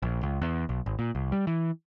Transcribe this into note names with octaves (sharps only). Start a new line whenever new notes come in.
A#1
C#2
E2
B1
G#1
A#2
C2
G3
E3